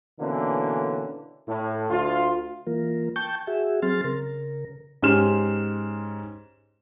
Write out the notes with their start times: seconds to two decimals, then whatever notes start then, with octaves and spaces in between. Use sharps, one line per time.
0.20 B2 D3 E3 A#3 C#4
1.48 A2
1.90 D2 F4
2.67 E3 A#3 F4 A#4
3.16 G5 A5 C#6 G6
3.47 F#4 G#4 E5
3.82 F#3 C4 G#4 C6 F6 A6
4.04 C#3 A#4
5.02 G#2 C#4 G4 C6 F6 E7